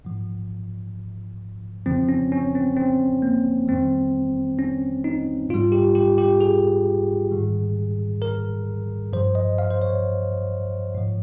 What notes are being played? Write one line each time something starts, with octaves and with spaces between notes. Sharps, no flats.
G#2 F3
F2 C#3 F3 C4
C#4
C#4
C4
C4
A#3
F2 D#3 G3 C4
C#4
D#4
G#2 G3 F4
G4
G4
G4
G#4
G#2 D#3 G3
A#4
G2 F3 C5
D#5
F5
C5
C#5
G#2 F3